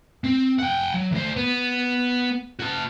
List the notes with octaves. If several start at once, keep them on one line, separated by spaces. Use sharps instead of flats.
C4
F#5 G5
F#3
D2 C5
B3
F#4 A5